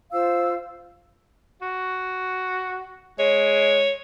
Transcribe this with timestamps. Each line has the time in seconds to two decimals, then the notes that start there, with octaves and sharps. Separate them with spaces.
0.12 F4 C5 F5 E6
1.62 F#4
3.19 G#3 C#5